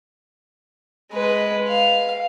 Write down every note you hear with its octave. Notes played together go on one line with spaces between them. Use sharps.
G#3 B4
F5